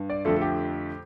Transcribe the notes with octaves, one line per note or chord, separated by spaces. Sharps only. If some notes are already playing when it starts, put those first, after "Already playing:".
Already playing: G2
D5
F2 D3 F3 A3 A4
A4
G4